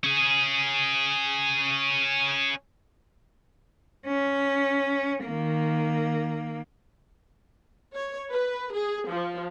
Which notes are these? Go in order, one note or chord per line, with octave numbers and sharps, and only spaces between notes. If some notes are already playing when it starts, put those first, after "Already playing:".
C#4 G#4
C#4
D#3 A#3
C#5
B4
G#4
F3